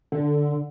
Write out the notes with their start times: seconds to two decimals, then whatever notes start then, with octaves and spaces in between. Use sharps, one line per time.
0.12 D3